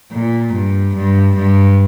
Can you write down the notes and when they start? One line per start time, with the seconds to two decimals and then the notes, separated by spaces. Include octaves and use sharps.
0.13 A#2
0.53 G2
0.95 G2
1.35 G2